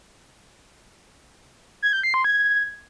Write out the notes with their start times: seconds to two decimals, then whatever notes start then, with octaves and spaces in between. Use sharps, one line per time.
1.82 G#6
1.93 G6
2.03 C7
2.14 C6
2.24 G#6